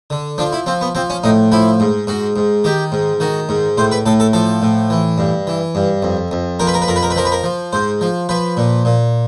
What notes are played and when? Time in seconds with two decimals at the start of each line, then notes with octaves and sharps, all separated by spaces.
0.10 D3
0.38 F3 D4
0.53 E4
0.66 F3 C4
0.81 B3
0.95 F3 C4
1.10 C#4
1.24 A2 D#4
1.52 F3 E4
1.80 G#2
2.07 G#2 F#4
2.36 G#2
2.64 D#3 G4
2.92 G#2
3.20 D#3 F#4
3.49 G#2
3.78 A2 C5
3.91 B4
4.06 A2 A4
4.20 A4
4.33 F3 A4
4.62 A2
4.90 E3
5.18 G2
5.47 E3
5.75 G2
6.03 F2
6.31 F2
6.60 F3 A#4
6.67 B4
6.74 A#4
6.82 B4
6.88 F2 A#4
6.96 B4
7.03 A#4
7.10 B4
7.16 F3 A#4
7.25 B4
7.32 A#4
7.44 F3
7.73 G#2 C5
8.01 F3
8.29 F3 B4
8.57 A#2
8.85 A#2